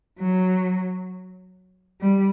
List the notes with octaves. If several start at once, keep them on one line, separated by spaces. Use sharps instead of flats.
F#3
G3